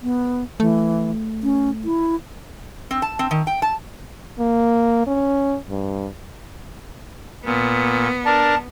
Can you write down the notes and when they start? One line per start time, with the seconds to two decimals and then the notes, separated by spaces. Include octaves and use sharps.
0.02 B3
0.60 E3 A3
1.43 C#4
1.84 E4
2.91 C4
3.02 A5
3.19 C4
3.31 D#3
3.47 G5
3.62 A5
4.39 A#3
5.07 C#4
5.69 G2
7.45 A#2 B3
8.25 D4 A#4 A5